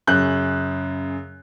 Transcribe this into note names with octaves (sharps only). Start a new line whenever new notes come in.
F#2 C#3 F#6 G6